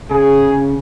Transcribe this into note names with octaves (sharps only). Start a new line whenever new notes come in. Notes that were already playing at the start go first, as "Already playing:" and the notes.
C#3 G#4